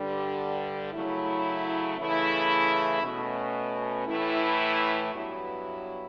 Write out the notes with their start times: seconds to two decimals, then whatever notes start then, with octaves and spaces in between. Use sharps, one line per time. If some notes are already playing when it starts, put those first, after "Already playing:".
Already playing: G2 D3 G3
0.93 C#3 F#3 A3 E4
1.98 C#3 E3 A3 E4
3.02 B2 A3 C#4
4.07 A2 E3 A3 E4
5.12 G2 F#3 B3 E4